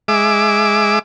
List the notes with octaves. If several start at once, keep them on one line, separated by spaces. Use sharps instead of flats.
G#3 E5 D6